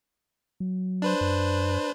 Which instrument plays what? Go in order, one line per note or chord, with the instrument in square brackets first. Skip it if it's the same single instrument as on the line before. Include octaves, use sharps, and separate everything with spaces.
[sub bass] F#3
[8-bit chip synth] D4 B4 C5
[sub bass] F#2